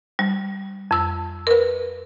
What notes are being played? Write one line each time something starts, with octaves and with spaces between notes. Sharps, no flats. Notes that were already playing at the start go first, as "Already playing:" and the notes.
G3
F2 E6
A#4 B4